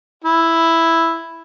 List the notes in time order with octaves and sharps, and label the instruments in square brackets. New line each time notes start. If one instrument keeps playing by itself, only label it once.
[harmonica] E4